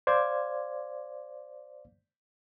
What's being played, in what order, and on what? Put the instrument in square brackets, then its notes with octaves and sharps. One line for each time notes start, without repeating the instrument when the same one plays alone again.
[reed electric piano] C5 D5 F5 G#6